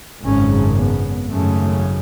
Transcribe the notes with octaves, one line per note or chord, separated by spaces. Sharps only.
G#1 F#2 C#3 C#4
B3
G#1 F#2 C#3 A3